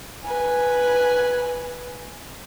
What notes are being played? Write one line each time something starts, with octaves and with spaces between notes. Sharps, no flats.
B4 G#5